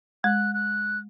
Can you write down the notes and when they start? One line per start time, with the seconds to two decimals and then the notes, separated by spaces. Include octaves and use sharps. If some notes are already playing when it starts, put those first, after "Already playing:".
0.24 G#3 F#6
0.54 F#6